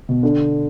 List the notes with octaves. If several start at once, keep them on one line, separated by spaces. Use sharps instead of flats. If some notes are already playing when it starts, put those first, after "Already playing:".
B2
D3